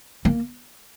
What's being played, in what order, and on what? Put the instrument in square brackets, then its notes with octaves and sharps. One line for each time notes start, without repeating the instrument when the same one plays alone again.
[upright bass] A#3